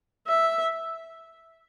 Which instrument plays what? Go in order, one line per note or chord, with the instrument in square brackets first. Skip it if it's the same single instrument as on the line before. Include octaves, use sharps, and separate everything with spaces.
[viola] E5